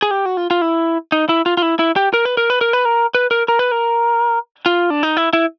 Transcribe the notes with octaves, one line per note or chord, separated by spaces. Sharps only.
G#4
G4
F#4
F4
F4
E4
D#4
E4
F4
F4
E4
E4
G4
A#4
B4
A#4
B4
A#4
B4
A#4
B4
A#4
A#4
B4
A#4
F4
D4
D#4
E4
E4